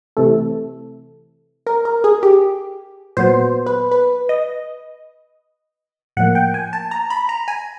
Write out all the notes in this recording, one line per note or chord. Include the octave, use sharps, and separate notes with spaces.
C3 E3 A3 A4
A#4
A#4
G#4
G4
A#2 F#3 B3 C5
B4
B4
D#5
A2 F3 A#3 F#5
G5
G#5
A5
A#5
B5
A#5
G#5